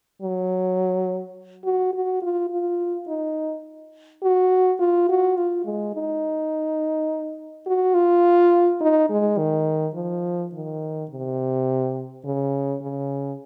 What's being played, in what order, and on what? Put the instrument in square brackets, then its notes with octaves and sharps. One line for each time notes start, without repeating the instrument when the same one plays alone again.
[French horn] F#3
F#4
F#4
F4
F4
D#4
F#4
F4
F#4
F4
G#3
D#4
F#4
F4
D#4
G#3
D#3
F3
D#3
C3
C#3
C#3